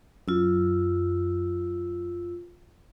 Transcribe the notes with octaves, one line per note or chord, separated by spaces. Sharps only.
F#2 F4 E6